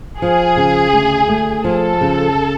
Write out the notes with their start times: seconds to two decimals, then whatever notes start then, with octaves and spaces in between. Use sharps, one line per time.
0.21 F3 G#4
0.57 C#3
0.93 D2
1.28 A3
1.64 F3 A4
2.01 C#3